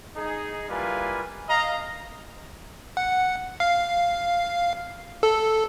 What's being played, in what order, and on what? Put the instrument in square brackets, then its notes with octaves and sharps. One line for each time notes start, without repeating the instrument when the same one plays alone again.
[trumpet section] D#4 G#4
G3 A#3 E4 F4 B4 G#5
D#5 F5 A#5
[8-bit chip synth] F#5
F5
A4